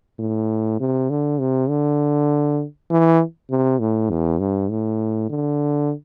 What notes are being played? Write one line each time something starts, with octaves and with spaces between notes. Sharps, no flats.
A2
C3
D3
C3
D3
E3
C3
A2
E2
G2
A2
D3